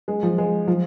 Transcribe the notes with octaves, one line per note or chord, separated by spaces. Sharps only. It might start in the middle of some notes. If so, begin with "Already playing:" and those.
G#3
F3
G#3
F3